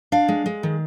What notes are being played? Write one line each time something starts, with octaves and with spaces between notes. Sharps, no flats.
D4 F5
G#3
G#3
D#3